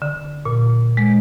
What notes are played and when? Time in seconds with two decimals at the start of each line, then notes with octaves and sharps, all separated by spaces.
0.02 D3
0.45 A#2
0.97 G#3